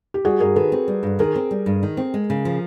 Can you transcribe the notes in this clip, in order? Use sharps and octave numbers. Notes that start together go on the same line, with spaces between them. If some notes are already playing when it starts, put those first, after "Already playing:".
G4
G3 F#4 G#4
G2 G#4 A#4
D#3 A4 B4
C4
G3
G2
D#3 G#4 A#4
C4
G3
G2
D#3
C4
G#3
C#3
F3